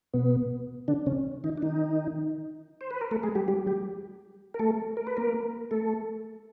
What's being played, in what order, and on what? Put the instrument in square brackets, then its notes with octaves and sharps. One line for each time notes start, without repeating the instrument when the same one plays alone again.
[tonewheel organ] B2 B3
D3 D4
C#3 C#4
D#3 D#4
D4
D#3 D#4
C5
B4
A#4
A3 A4
G#3 G#4
G3 G4
G3 G4
G3 G4
A#4
A3 A4
A#4
B4
A#3 A#4
A3 A4